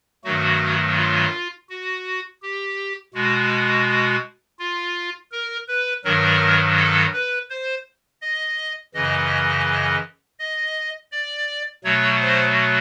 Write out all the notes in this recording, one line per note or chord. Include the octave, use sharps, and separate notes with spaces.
G2 D#3 F#3 A3 F#4
F4
F#4
G4
B2 G#3 F#4
F4
A#4
B4
G2 D#3 F#3 A#4
A4
B4
C5
D#5
F#2 C#3 E3 D#5
D#5
D5
B2 F#3 A3 C#5
C5